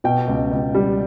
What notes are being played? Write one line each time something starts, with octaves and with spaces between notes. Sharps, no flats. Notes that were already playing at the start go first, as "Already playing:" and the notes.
B2 G5
C#2
C#2
G3